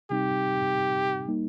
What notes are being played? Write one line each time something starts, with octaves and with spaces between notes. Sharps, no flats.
C3 G3 C4 D#4 G4
G3 A#3 D#4